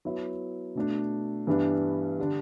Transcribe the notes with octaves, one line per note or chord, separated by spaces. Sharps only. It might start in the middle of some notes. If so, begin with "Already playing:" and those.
F#3 B3 E4
B2 A3 D4
G2 E3 G3 B3 D4
D3 G3 D4